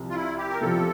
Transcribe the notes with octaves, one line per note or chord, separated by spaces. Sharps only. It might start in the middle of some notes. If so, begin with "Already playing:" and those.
Already playing: C2 C3 F3
F4
E4
G4
A#4
C2 C3 F3 A4